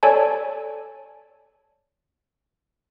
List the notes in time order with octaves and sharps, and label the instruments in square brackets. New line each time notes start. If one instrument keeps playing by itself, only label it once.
[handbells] A4 C#5 D5 G#5 A5